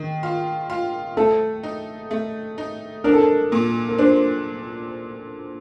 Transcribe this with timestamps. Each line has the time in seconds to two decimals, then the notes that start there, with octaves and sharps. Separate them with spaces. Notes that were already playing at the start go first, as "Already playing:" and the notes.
Already playing: D#3
0.23 F4
0.70 F4
1.17 A3 A4
1.63 D#4
2.11 A3
2.58 D#4
3.04 D4 A#4
3.13 A4
3.21 A#4
3.52 A#2
3.89 A#4
3.98 D4 C5